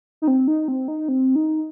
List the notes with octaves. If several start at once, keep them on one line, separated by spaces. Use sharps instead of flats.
D#4
C4
D#4
C4
D#4
C4
D#4